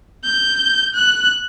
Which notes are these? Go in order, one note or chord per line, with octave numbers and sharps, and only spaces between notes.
G6
F#6